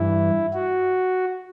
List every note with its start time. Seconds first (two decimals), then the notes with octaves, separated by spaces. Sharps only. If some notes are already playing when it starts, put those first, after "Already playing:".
Already playing: G2 E3 E4
0.54 F#4